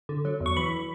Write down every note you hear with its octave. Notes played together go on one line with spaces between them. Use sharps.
D3
F#3
E2
C#6
E3 B5